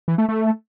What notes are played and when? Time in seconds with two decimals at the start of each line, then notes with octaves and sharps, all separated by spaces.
0.08 E3
0.18 A3
0.29 A3